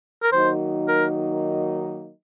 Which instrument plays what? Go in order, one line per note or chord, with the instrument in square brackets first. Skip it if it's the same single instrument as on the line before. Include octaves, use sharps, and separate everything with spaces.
[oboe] A#4
[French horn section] D#3 F#3 A#3 D#4 F#4 [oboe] C5
[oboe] A#4